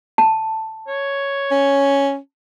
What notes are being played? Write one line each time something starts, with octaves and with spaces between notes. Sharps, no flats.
A5
C#5
C#4